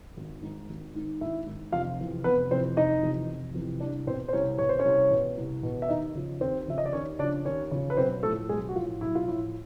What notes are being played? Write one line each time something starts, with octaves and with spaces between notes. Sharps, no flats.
G#1
G#2 D#3
G#1
G#2 D#3
G#1 E4 E5
G#2 D#3
F1 F4 F5
F2 C3 E3
F1 B3 B4
F2 C3 E3 C4 C5
F1 D#4 D#5
F2 C3 E3
F1
F2 C3 E3
C2 D4 D5
B2 C4 C5
C5
C2 C#4 C#5
B2 C#5
C5
C#4 C#5
C2
B2
C2
B2
E5
D#2 D#4 D#5
C#3 F3
D#2 C4 C5
C#3 F3 E5
D#5
D5
D#2 C#4 C#5
C#3 F3 D4 D5
D#2 C#4 C#5
C#3 F3
B4
B1 C4 C5
A2 F3 A3 A4
B1 G#3 G#4
F#4
A2 F3 F4
B1 E4
F4
A2 F3 E4